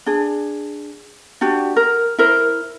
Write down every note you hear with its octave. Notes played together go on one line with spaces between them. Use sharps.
D4 G#4
D4 F#4 G4
A#4
E4 A#4 C5